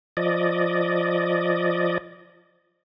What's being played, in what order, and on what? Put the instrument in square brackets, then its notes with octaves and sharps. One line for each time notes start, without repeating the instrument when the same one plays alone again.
[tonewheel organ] F3 D5 D#5